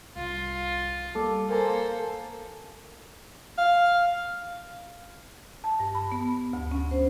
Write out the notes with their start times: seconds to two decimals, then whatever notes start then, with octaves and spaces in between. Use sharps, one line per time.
0.16 C2 F4
1.15 G3 A#3 A4 D6
1.49 A#3 A4 C5 F5 G#5 A#5
3.58 F5
5.64 A5
5.80 G2
5.95 B5
6.12 B3
6.53 D2
6.72 C#4
6.91 C5